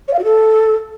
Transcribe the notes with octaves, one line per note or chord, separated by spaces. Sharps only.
C#5
F5
F#4
A4